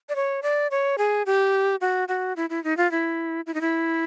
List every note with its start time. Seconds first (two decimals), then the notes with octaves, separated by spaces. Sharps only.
0.09 D5
0.16 C#5
0.43 D5
0.71 C#5
0.98 G#4
1.26 G4
1.81 F#4
2.08 F#4
2.36 E4
2.50 E4
2.64 D#4
2.77 F4
2.91 E4
3.47 E4
3.54 D#4
3.61 E4